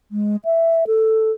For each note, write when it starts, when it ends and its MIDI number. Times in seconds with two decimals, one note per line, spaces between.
0.11 0.36 56
0.45 0.84 76
0.87 1.31 69